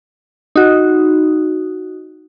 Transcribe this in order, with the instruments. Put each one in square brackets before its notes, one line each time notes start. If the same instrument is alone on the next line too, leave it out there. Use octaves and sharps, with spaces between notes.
[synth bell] D#4 F#4